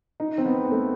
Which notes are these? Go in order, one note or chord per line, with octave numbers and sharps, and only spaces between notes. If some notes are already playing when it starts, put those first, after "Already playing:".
D#4
C4
B3
A3